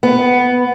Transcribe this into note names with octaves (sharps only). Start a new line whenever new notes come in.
B3